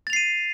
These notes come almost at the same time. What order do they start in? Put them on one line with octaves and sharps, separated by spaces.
A6 F7 C7 D#7